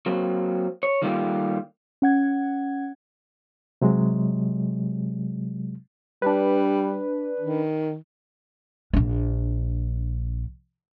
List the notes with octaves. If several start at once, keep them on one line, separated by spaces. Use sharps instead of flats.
F#3 A#3 C4
C#5
D#3 G3 A3 A#3 F4 G4
C#4 F#5 G#6
C3 F#3 G#3
G3 D4 B4
D#3
A#1 D4